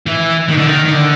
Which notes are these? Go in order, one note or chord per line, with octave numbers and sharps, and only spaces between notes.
E3
D#3
D3
D#3
D#3
D3